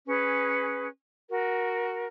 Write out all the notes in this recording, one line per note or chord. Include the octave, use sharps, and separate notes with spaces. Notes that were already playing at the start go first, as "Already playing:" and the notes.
C#4 G#4 B4
F#4 A#4